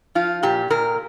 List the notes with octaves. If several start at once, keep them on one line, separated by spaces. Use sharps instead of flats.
F3 F4
A#2 G4
A#2 A#4